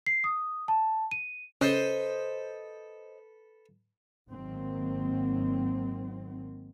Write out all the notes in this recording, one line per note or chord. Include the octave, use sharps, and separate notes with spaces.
C7
D#6
A5
D#7
C#3 A4 B4 C5 D#5
G#1 D#3 F#3 A#3 C4